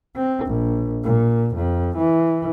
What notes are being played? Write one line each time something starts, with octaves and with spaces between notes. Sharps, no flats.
C4
A#1
A#2
F2
E3